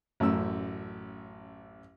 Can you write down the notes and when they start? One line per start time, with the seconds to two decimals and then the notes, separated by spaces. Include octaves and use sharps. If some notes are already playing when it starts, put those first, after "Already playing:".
0.20 A1 F#2 A3 E6